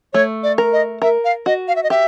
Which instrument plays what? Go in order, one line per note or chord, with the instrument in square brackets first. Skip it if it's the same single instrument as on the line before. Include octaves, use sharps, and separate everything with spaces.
[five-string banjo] A3 [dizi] C#5
[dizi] D5
[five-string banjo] A#4
[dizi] D#5
[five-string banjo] A#4 [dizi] E5
[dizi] F5
[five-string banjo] F#4 [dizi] D#5
[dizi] F5
E5
D#5
[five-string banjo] G4 [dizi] E5